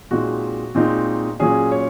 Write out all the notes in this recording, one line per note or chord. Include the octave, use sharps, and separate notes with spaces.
A#2 G#3 C4 D#4 F#4
A#2 G#3 C4 D#4
A#2 F#3 C#4 G#4
C#5